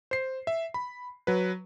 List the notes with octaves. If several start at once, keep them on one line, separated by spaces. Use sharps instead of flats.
C5 C7
E5
B5
F#3 B4